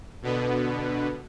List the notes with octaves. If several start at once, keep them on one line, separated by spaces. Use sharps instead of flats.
B2 D3 B3